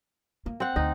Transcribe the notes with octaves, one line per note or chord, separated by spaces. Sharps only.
A#3
C4 F#5
D2 D#4